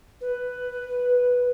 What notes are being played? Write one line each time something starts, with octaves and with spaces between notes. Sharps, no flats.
B4